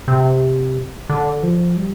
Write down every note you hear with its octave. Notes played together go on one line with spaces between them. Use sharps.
C3
D3
F3
G3